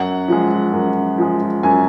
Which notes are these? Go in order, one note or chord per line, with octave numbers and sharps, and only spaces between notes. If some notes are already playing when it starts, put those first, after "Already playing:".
Already playing: F#2 F#5
F3 G#3
F#2
F3 G#3
F#2 G#5